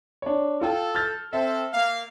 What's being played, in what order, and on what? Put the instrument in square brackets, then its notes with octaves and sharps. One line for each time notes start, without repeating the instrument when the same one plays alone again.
[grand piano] D4 C#5
[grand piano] F4 G5 [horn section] A4
[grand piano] F6 G6 A6
[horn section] C4 A4 [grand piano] E5
[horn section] A#3 F5